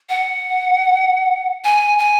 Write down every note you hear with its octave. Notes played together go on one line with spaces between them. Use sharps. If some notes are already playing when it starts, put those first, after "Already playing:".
F#5
G#5
G#5